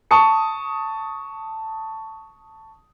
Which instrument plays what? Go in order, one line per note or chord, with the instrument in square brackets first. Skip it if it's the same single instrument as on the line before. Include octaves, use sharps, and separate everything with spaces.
[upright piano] A5 C#6 D#6 C#7